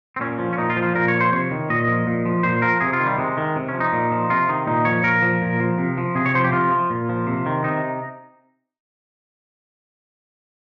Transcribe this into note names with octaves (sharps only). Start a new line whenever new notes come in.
C4
A#2 C#4
F3
C#4
A#2 D#4
F4
F3
F4
A#2 A#4
C#5
F3
C5
C3 C#5
D#3
A#2 D#5
F3
A#2
F3
A#2 C5
F3 A#4
C3 G#4
F4
D#3
G3
C3 G#3
D#3
C3
C#4
F3
D#4
A#2
F3
C3 F4
D#3 D#4
A#2 D#4
F3 C#5
A#2 A#4
F3
A#2
F3
C3
F3
C3 G#4
C#5
F3 C5
G4
C3 F4
F3
A#2
F3
C3
D#3
C3 D#4